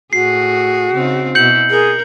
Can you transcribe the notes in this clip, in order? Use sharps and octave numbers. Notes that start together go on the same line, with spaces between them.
A2 F#4 G#4 C7
C#3 C4 D#4
B2 E4 G6 C#7 F#7
G#4 A#4